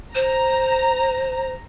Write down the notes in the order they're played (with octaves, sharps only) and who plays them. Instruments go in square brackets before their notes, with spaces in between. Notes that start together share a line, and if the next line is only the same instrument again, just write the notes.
[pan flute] C5 [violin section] A#5